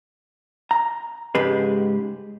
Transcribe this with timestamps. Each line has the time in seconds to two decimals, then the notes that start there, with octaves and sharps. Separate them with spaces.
0.71 A#5
1.35 G#2 C#3 G#3 G4 B4